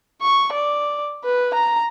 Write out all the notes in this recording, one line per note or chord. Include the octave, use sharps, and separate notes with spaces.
C#6
D5
B4
A#5